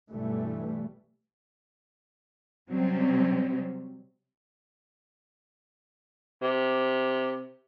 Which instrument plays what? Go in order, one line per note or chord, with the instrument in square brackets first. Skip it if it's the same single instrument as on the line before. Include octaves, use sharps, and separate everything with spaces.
[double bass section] B1 G2 E3 G3 A3
[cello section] C3 F#3 G3 C4 C#4
[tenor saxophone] C3